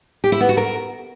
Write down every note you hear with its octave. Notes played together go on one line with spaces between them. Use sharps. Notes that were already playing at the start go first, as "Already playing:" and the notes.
G4
E4
B3
F#4
A#4